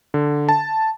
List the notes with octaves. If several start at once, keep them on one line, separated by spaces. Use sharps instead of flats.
D3
A5